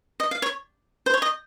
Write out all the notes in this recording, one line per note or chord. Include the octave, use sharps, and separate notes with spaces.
D#5
F5
C#5
C5
C#5
D#5